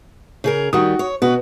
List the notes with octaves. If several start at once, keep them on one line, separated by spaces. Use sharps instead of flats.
C#3 G#4 A#4
D#3 G3 F#4 D#6
C#5
B2 F#4 B4